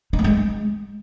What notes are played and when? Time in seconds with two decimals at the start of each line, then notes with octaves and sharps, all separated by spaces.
0.13 D#4
0.19 A#3
0.24 G#3